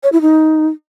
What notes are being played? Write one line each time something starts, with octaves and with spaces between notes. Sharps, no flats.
C#5
E4
D#4